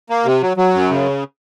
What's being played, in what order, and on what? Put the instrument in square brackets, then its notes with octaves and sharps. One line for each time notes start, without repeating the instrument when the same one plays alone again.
[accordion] A#3
C3
F#3
F#3
F#2
C#3